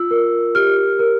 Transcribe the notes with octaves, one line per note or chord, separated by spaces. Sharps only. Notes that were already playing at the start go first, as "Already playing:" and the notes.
Already playing: F4 E6
A#4
G4 F6
A#4